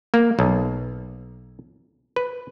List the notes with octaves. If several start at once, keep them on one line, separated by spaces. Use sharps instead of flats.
A#3
B1
B4